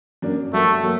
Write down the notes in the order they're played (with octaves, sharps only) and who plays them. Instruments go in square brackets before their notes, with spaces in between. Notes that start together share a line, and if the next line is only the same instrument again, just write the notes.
[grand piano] F#2 F#3 A#3 D4
[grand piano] G2 F#3 A#3 F#4 [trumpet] A3
[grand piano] F#3 A#3 F#4